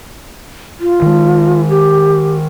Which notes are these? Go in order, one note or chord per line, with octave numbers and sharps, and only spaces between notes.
F4
D#3 G#3
G4